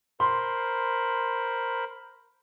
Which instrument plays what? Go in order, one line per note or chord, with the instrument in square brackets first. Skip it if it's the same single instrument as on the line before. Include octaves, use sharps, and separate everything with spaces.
[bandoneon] A#4 C5 B5 [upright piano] C6